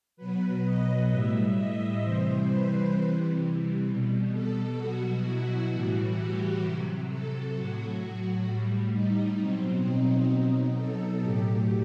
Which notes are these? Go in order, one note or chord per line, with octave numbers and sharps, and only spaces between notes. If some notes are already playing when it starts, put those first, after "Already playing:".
B2 F#3 B4
D#5
A2 G3 E5
D#5
C3 E3 G3 C5
B4
C3 E3 G3
B2 G3
A4
B2 F#3 F#4
E4
A2 E3 G3 F#4
G4
C3 F#3
A4
A2 F#3 F#4
A2 G3
D#4
B2 F#3 C4
D#4
B2 F#3 D#4
A4
A2 F#3 G4